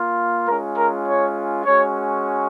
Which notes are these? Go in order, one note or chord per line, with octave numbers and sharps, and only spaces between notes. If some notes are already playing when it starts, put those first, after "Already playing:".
Already playing: A#3 F4
G#3 C#4 F4 A#4
A#4
C#5
G#3 C#4 F#4 C#5